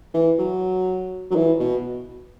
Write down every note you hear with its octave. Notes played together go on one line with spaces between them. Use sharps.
E3
F#3
F#3
E3
B2